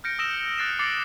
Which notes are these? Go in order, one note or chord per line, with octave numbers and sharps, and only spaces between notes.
F6 G6 A#6 C#7 D7
D#6 E6 A#6 D7 E7 G7
D#6 F#6 A6 C7 D7 E7
D6 A6 C7 C#7 F#7